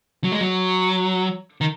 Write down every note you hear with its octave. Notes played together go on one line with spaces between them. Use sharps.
F#3
G#3
F#3
D#3